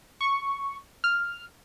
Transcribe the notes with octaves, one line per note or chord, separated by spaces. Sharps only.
C#6
F6